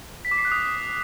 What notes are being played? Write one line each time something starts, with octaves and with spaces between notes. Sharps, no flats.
B6
D6
C7
F#6
D#6